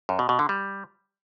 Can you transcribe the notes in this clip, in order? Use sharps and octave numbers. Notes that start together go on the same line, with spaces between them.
F#2
B2
B2
D3
G3